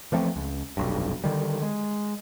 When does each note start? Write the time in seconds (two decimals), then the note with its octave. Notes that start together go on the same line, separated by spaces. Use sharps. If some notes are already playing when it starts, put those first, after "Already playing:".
0.12 E3 F3 A3 C4
0.36 C#2
0.77 F1 B1 G2
1.24 D3 D#3 G3
1.62 G#3